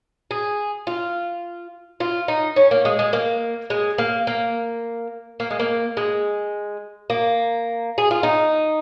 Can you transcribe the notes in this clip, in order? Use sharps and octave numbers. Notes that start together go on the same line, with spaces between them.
G#4
F4
F4
D#4
C#4
A#3
G#3
G#3
A#3
G#3
A#3
A#3
A#3
G#3
A#3
G#3
A#3
G#4
F4
D#4